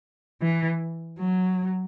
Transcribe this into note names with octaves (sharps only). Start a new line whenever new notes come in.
E3
F#3